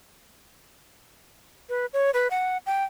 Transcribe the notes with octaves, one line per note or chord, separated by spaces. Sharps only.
B4
C#5
B4
F#5
G5